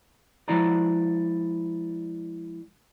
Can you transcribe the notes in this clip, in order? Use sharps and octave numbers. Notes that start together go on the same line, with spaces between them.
F3 G#3 E4 D5 A#5